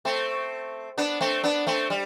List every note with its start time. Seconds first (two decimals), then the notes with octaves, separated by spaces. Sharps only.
0.05 A3 C4
0.98 B3 D4
1.20 A3 C4
1.44 B3 D4
1.66 A3 C4
1.90 G3